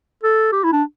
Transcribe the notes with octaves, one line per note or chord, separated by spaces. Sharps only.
A4
G4
E4
D4